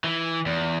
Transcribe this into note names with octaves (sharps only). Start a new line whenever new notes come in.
E3
E2